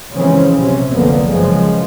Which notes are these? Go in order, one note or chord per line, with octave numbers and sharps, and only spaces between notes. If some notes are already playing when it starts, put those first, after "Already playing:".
C#3 E3 F3 G#3 C4 C#4
B1 C3 C4 C#4
F#1 C2 D3 F3 A#3 B3
F#2 C#3 E3 F3 G#3